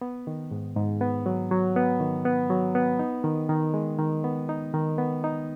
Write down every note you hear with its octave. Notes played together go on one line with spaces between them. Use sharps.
B3
D#3
G#2
G#2
B3
F#3
F#3
B3
D#3
B3
F#3
B3
D#4
D#3
D#3
G#3
D#3
B3
D#4
D#3
B3
D#4